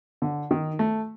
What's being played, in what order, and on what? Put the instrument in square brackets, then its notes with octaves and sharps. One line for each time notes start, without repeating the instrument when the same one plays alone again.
[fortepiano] D3
D#3
A3